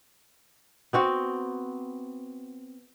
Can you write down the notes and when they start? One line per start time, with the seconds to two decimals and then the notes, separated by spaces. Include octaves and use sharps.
0.93 B3 C4 F#4